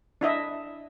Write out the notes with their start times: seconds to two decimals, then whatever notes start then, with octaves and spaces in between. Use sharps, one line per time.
0.21 D4 E4 D#5 E5